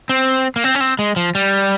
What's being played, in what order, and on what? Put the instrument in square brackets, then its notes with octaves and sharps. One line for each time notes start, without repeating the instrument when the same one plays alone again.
[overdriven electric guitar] C4
A#3
C4
C#4
C4
G#3
F3
G3